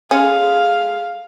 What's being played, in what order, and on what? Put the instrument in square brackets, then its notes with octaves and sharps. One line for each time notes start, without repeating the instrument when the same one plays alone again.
[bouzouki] G#3 G#4 A4 [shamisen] C#4 [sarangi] F5